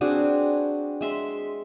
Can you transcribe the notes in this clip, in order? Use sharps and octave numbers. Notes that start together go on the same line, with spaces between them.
C4 D4 F#4 G#4
G#3 E5 C6